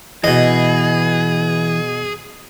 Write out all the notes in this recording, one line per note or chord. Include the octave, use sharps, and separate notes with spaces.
B2 E3 G#4 D#5